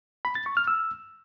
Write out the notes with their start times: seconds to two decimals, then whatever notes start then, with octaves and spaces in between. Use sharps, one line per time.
0.25 B5
0.35 A6
0.46 C#6
0.57 F6
0.67 E6